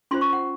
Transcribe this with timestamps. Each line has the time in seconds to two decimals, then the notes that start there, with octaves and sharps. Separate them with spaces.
0.11 C#4 F4 C5 C6
0.21 C#6
0.33 F#5